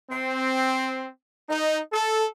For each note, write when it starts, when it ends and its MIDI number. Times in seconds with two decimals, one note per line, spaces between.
0.11 1.07 60
1.49 1.79 63
1.93 2.25 69